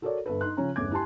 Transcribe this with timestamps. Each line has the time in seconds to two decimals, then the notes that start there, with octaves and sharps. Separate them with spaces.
0.02 F#4 A4 A#4 C#5 D5
0.26 G1 A4 B4
0.41 D#4 C6 F#6
0.57 C#3 F3 C#4 A#5
0.76 G1 E2 A3 C#4 D6 G#6
0.91 E4 G4 G#5 A5 C6